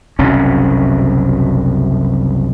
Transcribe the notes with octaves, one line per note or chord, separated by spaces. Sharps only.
F#1 C2 B2 C#4